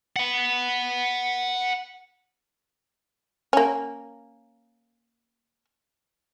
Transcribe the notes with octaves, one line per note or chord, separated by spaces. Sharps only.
F#5 B5
A#3 C#4